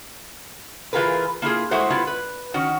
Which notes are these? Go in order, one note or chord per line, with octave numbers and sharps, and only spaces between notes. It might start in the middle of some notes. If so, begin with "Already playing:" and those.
E3 F4 G#4 A#4 B4
A#3 E4 F4 G#4
G#3 A3 E4 F#4 C5
G3 B3 E4 F4
B4
D#3 C#4 F#4